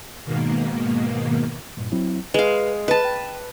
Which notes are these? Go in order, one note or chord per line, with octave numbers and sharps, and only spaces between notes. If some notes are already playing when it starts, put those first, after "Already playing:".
G#2 B2 D#3 A#3
G2 A#2
F#3 C4 E4
G#3 B4 F5
B4 D#5 A5
G5